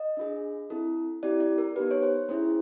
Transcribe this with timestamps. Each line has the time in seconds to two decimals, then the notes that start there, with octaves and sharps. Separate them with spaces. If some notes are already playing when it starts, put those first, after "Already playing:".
Already playing: D#5
0.17 D4 F4 G#4
0.70 C4 E4 A4
1.23 C4 E4 G4 D5
1.40 D5
1.58 A#4
1.76 B3 D#4 G4 B4
1.91 C#5
2.03 C5
2.29 A#3 C#4 E4 G#4 C5